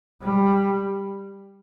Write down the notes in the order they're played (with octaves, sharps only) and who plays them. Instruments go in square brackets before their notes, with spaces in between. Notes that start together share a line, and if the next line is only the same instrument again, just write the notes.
[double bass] G3